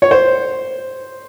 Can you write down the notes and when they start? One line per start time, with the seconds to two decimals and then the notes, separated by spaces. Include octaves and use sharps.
0.02 C#5
0.11 C5